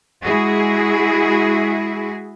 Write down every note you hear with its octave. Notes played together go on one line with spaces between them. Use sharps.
G#3 E4 F#4 G#4